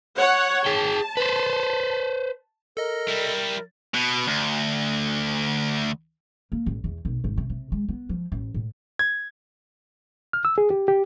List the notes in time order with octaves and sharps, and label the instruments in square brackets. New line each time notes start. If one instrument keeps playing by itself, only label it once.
[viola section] C#5 F#5
[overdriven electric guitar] G#4 G5 [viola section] A5
[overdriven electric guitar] B4 C5
[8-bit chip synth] A4 D#5 [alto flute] A#4
[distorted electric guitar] G3 E4
B2
D2
[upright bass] A#3
A1
E2
B1
G#1
C3
C3
G#3
B3
F3
A1
A2
[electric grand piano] G#6
[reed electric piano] F6
E6
G#4
G4
G4